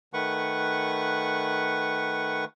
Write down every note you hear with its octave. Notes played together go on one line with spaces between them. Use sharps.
D#3 A3 B4 F#5 C#6